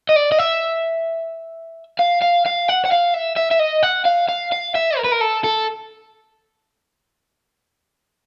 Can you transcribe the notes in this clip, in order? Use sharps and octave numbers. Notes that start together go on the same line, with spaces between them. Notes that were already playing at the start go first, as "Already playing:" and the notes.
D#5
D5
D#5
E5
F5
F5
F5
F#5
F#5
F5
E5
E5
E5
D#5
F#5
F5
F5
F5
E5
A#4
B4
A#4
A4
A4